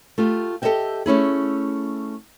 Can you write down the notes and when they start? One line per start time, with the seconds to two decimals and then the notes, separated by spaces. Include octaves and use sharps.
0.18 A3 F4 G4
0.62 G4 A4 C5 D#5 E5 G5
1.06 A3 C#4 E4 G#4